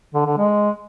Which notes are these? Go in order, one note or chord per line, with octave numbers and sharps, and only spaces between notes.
D3
D3
G#3